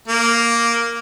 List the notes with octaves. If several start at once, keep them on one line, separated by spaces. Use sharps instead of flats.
A#3